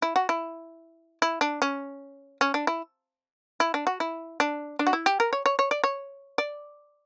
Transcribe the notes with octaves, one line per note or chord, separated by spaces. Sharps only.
E4
F#4
E4
E4
D4
C#4
C#4
D4
E4
E4
D4
F#4
E4
D4
D4
F#4
E4
G4
A#4
C#5
C#5
C#5
D5
C#5
D5